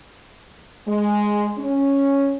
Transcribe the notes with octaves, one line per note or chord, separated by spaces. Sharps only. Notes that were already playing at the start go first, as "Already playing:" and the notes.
G#3
C#4